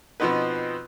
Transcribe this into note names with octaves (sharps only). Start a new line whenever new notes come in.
B2 F3 B3 C4 D#4 B4